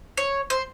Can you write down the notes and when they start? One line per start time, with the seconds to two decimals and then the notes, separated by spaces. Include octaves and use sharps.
0.17 C#5
0.50 C5